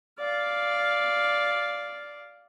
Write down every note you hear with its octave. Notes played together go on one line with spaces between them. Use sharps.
D5 F5